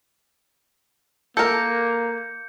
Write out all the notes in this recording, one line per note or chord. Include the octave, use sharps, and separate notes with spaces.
A#3 A4 A#4 G6 C#7